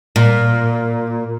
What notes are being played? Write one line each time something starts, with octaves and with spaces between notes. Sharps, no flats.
A#2